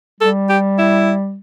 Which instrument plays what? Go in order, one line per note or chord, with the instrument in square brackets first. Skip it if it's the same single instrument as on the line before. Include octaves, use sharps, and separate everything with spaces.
[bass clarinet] G3 [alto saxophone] A4
[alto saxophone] G4
E4